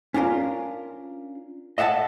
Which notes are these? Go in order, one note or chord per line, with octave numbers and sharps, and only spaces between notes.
C#4 D4 F4 A#4
D#5 E5 F#5 G#5 A5